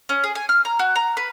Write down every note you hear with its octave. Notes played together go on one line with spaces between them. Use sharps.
C#4
G#4
G#5
F6
A#5
F#4
A#5
B4